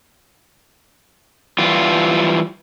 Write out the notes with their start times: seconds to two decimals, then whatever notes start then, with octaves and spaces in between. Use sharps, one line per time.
1.58 E3 G3 F4